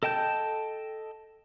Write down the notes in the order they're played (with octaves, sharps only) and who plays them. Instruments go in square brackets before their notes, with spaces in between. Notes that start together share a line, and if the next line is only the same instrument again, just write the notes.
[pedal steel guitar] A4 D#5 G5 A5 G6